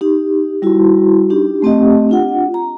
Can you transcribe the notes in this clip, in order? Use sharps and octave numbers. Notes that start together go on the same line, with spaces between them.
D#4 G4
G3 E4 F#4
D4 D#4 G4
A3 C4 G4 D#5
D4 F4 F#5
A#5